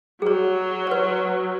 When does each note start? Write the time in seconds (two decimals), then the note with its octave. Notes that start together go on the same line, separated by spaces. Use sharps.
0.22 F#3 G#4 C#5
0.87 B4 C#5